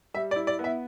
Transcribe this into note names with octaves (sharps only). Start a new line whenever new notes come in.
G3 E5
D5
E4
D5
B3
E5